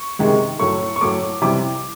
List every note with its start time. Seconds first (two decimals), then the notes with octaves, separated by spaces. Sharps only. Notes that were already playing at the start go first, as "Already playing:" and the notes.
Already playing: C#6
0.19 C3 D#3 G#3
0.59 A2 F#3 A3 C#6
0.96 C#6
1.01 A2 F#3 A3 D6
1.42 C3 E3 G3 D6